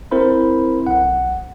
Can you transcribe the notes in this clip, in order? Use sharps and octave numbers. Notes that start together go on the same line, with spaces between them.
C4 E4 A#4 C5 B5
B1 F#5